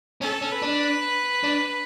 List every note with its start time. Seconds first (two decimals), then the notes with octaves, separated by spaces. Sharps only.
0.21 C#4 A4
0.42 C#4
0.52 B4
0.62 D4
1.43 D4